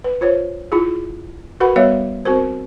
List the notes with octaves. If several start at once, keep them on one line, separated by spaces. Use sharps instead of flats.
B4
F4 C5 C#5
E4 F4 G#4
F#4 A#4 B4 F#5 B5
G3 B3 C#5 E5 F5
C4 F#4 A#4 C5